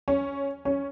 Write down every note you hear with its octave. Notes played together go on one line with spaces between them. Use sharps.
C#4
C#4